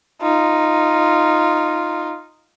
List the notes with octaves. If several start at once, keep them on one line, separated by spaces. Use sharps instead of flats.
D#4 F4